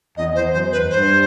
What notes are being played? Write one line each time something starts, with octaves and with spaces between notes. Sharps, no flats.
E2 D#5
E2 C5
F#2 C5
E2 B4
G2 C5